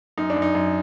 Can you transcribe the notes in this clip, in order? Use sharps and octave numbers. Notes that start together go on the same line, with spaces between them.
F#2 D#4
D4
F#2
D#4
F#2